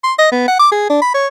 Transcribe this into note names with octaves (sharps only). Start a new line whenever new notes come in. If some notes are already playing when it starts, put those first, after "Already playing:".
C6
D#5
B3
F#5
D6
G#4
D4
B5
C#5